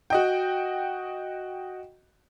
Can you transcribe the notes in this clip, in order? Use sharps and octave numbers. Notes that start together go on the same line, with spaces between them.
F#4 D#5 G5